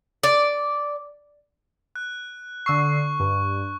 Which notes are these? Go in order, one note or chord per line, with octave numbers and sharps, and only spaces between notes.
D5
F#6
D3 C#6 E6 C7
G2